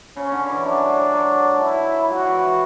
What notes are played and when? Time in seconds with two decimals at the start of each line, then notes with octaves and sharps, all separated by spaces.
0.17 C#3 C#4
0.32 D3
0.49 E3
0.65 F#3 D4
0.89 G#3
1.13 F#3
1.61 E4
2.10 G#3 F#4
2.27 E3
2.43 E3